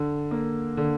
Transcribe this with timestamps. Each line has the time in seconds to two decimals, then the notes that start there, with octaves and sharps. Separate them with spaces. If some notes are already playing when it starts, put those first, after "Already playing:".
Already playing: D3
0.31 A#3
0.77 D3